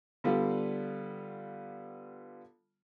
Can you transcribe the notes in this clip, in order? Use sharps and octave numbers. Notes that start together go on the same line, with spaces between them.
D3 G3 B3 F4